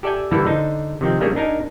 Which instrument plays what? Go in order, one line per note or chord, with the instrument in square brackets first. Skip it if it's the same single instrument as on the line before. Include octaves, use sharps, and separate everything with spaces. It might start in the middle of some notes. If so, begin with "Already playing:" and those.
[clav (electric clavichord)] G4 A4 D5 E5 G5 G#5
D3 E3 G3 A#3 E4 A4
D3 D#4 C5
C3 D#3 F3 C4
G3 A3 A#3 C#4 D4 G#4
D4 D#4 A#4 G#5